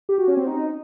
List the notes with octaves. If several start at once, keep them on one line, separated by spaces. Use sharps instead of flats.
G4
F#4
C#4
C4
D#4